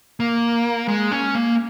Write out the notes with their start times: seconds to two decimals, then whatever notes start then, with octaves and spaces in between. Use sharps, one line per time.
0.20 A#3
0.88 G#3
1.12 C#4
1.35 A#3